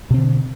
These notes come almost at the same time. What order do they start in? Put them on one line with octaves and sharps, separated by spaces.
B2 C4 D3